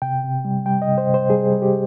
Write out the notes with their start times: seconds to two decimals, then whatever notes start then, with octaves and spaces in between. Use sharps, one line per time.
0.02 C3 G5
0.24 C3
0.45 G3
0.66 G3 G5
0.82 D#5
0.88 C3
0.98 C5
1.09 C3
1.14 C5
1.30 G3 G#4
1.52 G3
1.62 G4